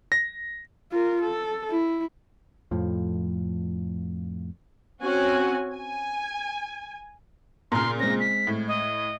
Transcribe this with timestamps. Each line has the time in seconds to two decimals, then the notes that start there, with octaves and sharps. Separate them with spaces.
0.12 A#6
0.91 F4 A#4
1.21 A4
1.70 E4
2.71 F2 A2 F3
5.02 C4 C#4 F#4 G#5
5.73 G#5
7.72 A#2 C#3 A#5 C6 F6
8.00 G#3 C4 A#6
8.20 B6
8.47 A2
8.68 D#5